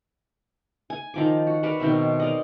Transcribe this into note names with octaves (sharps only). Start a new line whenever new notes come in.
G#5
D#3 F3 D6
F#4
F#4 A#4 B4 D5
B2 D#3 C4 E5
A#4 D5 D#5